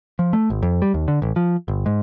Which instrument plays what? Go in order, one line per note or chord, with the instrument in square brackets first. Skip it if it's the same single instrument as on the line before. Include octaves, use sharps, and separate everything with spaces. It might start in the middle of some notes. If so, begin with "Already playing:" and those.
[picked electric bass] F3
A3
G#1
F2
G3
D#2
D3
A1
F3
G1
G#2